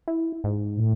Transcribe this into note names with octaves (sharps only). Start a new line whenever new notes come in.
E4
G#2
A2